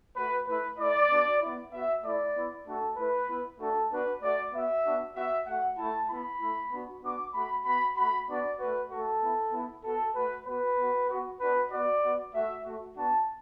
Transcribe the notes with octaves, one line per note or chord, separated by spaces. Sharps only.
A3 F#4 B4
A3 E4 B4
A3 E4 D5
B3 D4 F#4
B3 E4
B3 F#4 E5
A3 E4 D5
B3 E4
A3 D4 F#4 A4
A3 E4 B4
B3 E4
A3 D4 F#4 A4
B3 D4 F#4 B4
A3 F#4 D5
B3 F#4 E5
B3 D4 F#4
B3 F#4 E5
A3 F#4 F#5
A3 E4 A5
B3 E4 B5
A3 E4
B3 D4 F#4
B3 D4 F#4 D6
A3 F#4 B5
B3 F#4 B5
A3 F#4 B5
B3 D4 F#4 D5
A3 F#4 B4
A3 F#4 A4
B3 E4
B3 E4
B3 F#4 A4
A3 F#4 B4
B3 F#4 B4
B3 F#4
B3 F#4
B3 D4 F#4 B4
B3 F#4 D5
B3 F#4
A3 F#4 E5
A3 F#4
B3 D4 F#4 A5